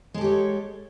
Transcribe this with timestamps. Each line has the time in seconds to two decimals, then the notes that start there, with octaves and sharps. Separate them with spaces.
0.14 G#3
0.18 A4
0.21 G4
0.24 C#5